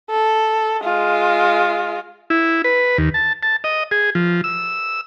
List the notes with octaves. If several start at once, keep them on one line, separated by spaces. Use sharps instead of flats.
A4
G#3 F4
E4
B4
D#2
A5
A5
D#5
G#4
F3
E6